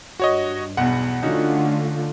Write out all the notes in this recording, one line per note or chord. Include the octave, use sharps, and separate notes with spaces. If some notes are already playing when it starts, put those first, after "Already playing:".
G2 F#4 C#5 D#5
B1 E2 F#5
D3 A3 C#4 D#4 F4 F#4